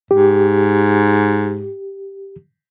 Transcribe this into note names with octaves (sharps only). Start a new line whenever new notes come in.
G#2 G4